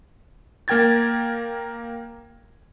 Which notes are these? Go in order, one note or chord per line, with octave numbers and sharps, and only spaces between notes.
A#3 A#4 G5 G#6 A6